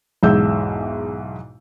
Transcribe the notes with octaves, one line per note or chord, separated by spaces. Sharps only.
B1 E2 G#2 E5 E6 G6